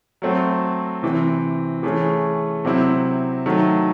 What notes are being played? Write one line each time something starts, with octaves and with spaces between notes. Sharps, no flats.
F#3 A3 C4 F#4
C3 E3 C4
E3 A3 C#4 G#4
C3 F#3 C4 E4
D#3 F#3 A3